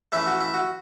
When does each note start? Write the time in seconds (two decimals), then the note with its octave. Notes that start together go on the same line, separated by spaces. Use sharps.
0.12 E3 A3 C#4 E4
0.27 F#4
0.40 E4
0.54 F#4